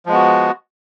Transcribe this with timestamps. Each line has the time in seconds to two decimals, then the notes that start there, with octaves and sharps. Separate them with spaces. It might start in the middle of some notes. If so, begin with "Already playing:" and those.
0.06 F3
0.09 G#3
0.12 B3
0.14 F#4